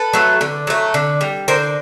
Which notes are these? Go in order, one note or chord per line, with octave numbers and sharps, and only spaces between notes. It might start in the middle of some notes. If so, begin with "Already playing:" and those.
Already playing: A4 B4
F#3 A3
D3
F#3 A3
D3
G3
D3 A#4 C5